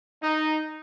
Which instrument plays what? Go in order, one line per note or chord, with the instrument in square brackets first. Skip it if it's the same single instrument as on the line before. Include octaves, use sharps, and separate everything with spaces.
[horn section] D#4